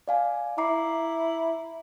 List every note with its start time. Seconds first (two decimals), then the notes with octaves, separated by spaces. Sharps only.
0.08 D5 F5 G#5
0.58 E4 A#5 D6 C7